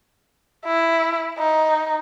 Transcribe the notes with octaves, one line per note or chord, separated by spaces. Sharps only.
E4
D#4